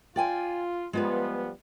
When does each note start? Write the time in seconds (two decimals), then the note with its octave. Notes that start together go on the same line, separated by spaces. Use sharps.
0.16 F4 D5 G5 G#5
0.93 F3 G3 G#3 B3 F4 B4